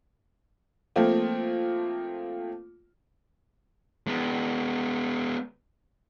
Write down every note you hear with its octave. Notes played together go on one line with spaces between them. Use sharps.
F3 A3 A#3 C4 F4
G#3 B3